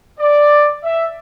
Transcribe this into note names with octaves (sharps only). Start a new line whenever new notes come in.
D5
E5